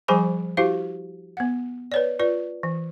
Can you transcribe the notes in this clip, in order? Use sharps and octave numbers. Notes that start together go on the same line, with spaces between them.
F3 G3 G#4 C5 G#5 B5
E4 F#4 G4 C5 F5
B3 F#5
B4 C#5 D5
F4 B4 D5
E3